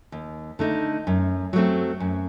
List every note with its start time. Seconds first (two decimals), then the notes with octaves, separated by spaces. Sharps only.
0.12 D#2
0.59 D3 A3 D#4
1.07 F#2
1.53 F#3 A3 C4
2.00 F#2